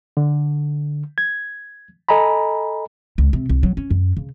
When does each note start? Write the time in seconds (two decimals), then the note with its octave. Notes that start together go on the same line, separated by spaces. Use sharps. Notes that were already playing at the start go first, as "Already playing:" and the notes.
0.17 D3
1.18 G#6
2.09 A4 D#5 G#5 A#5 B5
3.18 C#2
3.33 C3
3.49 C2
3.63 F#3
3.77 C#4
3.91 F#2
4.17 C#3